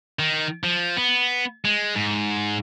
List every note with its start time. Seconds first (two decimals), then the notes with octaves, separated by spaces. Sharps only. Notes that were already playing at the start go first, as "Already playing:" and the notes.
0.19 D#3
0.64 F3
0.97 B3
1.65 G#3
1.95 G#2